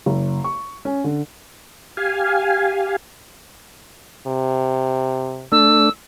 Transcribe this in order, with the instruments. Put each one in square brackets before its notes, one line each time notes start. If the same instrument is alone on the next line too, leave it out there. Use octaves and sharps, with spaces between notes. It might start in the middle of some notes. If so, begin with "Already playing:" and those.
[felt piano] F#1
C#6
C#4
D3
[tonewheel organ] G4 F5 G#5
[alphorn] C3
[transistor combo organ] A3 D4 [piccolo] E6